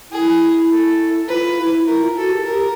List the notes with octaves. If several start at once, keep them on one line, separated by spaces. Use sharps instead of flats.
E4 G#4
A4
F4 B4
F4
E4
E4
E4 A#4
F4
F#4 A4
G4
G4 A#4